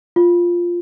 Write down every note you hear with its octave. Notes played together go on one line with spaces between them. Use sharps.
F4